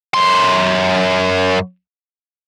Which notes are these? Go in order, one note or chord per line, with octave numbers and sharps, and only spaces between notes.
F#2 C6